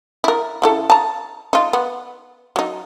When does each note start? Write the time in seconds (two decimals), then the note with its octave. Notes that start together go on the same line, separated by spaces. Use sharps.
0.24 E4 A#4
0.62 C#3 E4 A4
0.90 A5 A#5
1.53 D#4 F4
1.73 B3
2.56 F#3 D#4